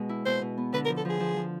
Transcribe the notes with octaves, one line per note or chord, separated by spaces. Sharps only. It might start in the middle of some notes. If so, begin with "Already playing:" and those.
Already playing: B2 G#3
E4
B2 C5
B2
B3
D3 B4
A#4
F3
A4
F3 G#4
F3
F3